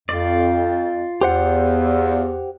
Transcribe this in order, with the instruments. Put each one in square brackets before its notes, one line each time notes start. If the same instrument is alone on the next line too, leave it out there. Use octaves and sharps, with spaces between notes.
[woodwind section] F2 [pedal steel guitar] F4 D5
[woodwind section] E2 [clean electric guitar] G4 C5 F#5